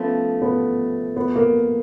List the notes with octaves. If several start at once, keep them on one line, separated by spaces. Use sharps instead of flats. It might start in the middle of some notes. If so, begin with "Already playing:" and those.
Already playing: F3 A3 B3 C#4 F4 A4
B3
B3
A#3